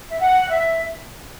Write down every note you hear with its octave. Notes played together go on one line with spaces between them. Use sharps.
E5
F#5
E5